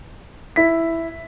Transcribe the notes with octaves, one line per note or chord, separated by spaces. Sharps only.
E4 B6